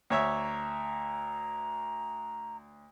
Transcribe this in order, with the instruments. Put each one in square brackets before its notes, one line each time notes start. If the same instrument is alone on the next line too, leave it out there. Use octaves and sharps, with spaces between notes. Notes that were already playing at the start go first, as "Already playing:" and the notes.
[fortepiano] D2 C#5 E5 [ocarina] A#5